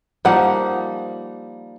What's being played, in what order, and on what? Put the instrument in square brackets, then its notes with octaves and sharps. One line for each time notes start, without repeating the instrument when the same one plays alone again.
[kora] F3 A#3 D#4 [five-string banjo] G3 F#5